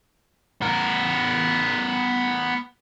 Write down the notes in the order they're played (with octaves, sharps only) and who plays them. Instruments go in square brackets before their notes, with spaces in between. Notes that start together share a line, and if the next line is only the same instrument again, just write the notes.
[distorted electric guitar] B3 A#4